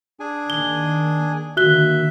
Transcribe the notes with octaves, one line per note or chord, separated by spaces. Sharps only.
D4 G#4 G#5
D#3 A#3 G7
D3 D#3 A#3 F#4 E5 F#6 G7